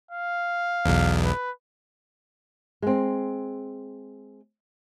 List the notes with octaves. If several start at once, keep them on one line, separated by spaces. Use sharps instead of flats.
F5
B1 E2
B4
G#3 C4